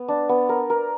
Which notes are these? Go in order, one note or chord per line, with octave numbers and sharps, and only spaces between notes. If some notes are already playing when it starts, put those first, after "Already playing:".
Already playing: B3
D4
B3
A#4
A#4